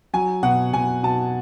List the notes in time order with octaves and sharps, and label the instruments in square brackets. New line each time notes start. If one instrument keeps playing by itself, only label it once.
[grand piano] F#3 G#5
B2 F#5
B2 G#5
B2 A5